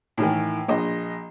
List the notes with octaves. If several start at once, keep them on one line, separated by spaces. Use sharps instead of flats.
A2 D#3 E3
A#1 D#5